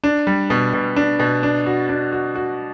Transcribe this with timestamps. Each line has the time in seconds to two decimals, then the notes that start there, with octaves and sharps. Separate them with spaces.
0.04 D4
0.27 G3
0.50 B2
0.73 B2
0.96 D4
1.20 B2
1.43 D4
1.66 F#4
1.89 D4
2.12 F#4
2.36 F#4